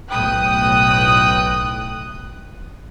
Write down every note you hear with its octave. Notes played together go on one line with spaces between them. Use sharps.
B1 A2 G5 D#6 F#6